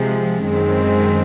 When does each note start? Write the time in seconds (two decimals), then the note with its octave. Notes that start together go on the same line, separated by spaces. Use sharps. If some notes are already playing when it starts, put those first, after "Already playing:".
Already playing: C3 F3 G#3
0.45 F#2 D#3 G#3 C4